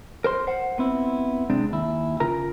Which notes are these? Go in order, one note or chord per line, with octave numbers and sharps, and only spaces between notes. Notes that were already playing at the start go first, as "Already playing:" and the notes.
A#4 C5 C6
C5 F#5
B3 C4 E4
C3 G#3 C4 D4
D#2 E4
C#3 F4 A#4 A#5